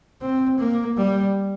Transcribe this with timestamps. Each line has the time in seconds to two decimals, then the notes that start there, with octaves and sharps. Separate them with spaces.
0.21 C4
0.59 A#3
0.97 G3